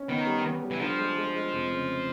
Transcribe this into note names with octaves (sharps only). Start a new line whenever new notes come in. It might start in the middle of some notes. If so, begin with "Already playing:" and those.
Already playing: C#4
D#3 B3
G3
B3
G3
E3
D3 F3
G#3
G#3
G#3
F1
C#3